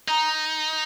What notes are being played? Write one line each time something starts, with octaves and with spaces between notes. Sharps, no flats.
D#4 A#5